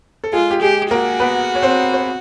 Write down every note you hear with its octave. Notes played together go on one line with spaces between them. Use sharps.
A4
G#3 F4 G#4
G4
G#3 G4 G#4
A#3 F#4 A#4
B3 B4
C#5
C4 C5
C5